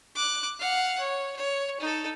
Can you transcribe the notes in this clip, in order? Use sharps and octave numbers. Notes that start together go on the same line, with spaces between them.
D6 F#6
F5 F#5
C#5
C#5
D#4 A4